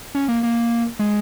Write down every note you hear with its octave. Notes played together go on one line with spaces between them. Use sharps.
C#4
A#3
A#3
G#3